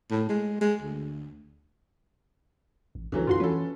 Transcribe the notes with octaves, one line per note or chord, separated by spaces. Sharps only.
A2
G#3
G#3
D2
A1
C#2 D3 E3 F#3
F2 F4 F#4 C6
E3 C#4 A4 B4